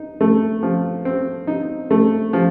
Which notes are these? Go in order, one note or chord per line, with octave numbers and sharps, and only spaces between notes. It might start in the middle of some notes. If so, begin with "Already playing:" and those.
Already playing: D#4
A3
F3
C4
D#4
A3
F3